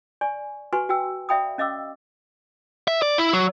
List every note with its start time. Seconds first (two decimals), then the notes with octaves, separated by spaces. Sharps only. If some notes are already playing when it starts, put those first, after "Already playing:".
0.21 D5 G#5 C#6
0.73 F#4 B4 G#5 C6 C#6
0.89 F#4 G5 E6
1.29 D5 E5 F5 G5 B5 D#6
1.58 C#4 D#5 F5 D6 E6
2.88 E5
3.02 D5
3.18 E4
3.33 F#3